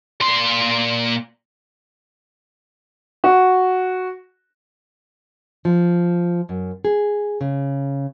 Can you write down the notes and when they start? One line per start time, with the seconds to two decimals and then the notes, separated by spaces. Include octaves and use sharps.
0.21 A#2 C6
3.24 F#4
5.65 F3
6.49 F#2
6.85 G#4
7.41 C#3